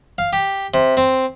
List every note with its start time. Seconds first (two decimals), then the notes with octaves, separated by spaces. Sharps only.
0.18 F5
0.33 G4
0.74 C3
0.97 C4